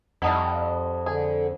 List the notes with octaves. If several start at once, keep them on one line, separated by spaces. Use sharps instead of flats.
F2 G3 D#4 E4 F#5 A5 D#6
D3 G#4